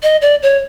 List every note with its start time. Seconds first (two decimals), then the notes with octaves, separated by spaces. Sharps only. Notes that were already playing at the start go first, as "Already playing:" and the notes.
0.03 D#5
0.22 D5
0.43 C#5